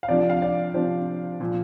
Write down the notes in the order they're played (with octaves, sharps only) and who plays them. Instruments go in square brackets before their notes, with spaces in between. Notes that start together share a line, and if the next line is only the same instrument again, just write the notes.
[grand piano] F5
C3 F3 D4 D5
F5
D5
C3 F3 D4 C5
A#2 F3